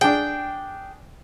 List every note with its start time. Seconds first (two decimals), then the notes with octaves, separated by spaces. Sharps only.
0.01 D4 G#4 G5